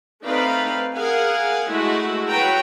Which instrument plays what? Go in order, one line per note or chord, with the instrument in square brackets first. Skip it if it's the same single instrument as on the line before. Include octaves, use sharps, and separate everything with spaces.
[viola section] A3 C4 D#4 B4 D5 F5
G#4 A#4 F5 F#5 G#5
G#3 A3 E4 F#4
F#3 A3 F#4 B4 G5 A#5